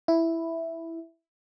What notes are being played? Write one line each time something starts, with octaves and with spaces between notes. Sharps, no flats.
E4